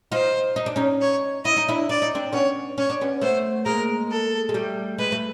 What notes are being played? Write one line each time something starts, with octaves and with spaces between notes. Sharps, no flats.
D#4 F4 C5
D#4
D4
C#4 D#4
C#5
E4 D#5
D#4
D4 E4
D4 D5
D#4
C4 D4
B3 C#4 C#5
C#4 C#5
D4
B3 C#4
A3 B3 C5
G#3 A#3 A#4
A4
G#3
G3 A3
G#3 B4
A3